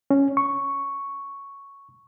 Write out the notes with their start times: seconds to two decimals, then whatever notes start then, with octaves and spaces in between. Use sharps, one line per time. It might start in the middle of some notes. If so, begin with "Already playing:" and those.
0.11 C#4
0.37 C#6